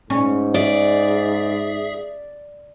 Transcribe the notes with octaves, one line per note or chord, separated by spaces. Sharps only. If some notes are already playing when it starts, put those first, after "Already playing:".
G#2 C#4
G#4 D5 E5